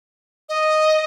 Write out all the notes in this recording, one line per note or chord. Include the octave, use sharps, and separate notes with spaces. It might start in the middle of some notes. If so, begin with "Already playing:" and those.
D#5